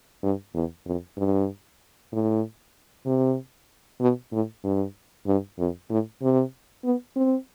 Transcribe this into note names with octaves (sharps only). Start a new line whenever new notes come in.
G2
E2
F2
G2
A2
C3
B2
A2
G2
G2
F2
A2
C3
B3
C4